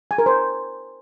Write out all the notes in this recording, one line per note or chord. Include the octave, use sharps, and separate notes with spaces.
G#5
A#4
C5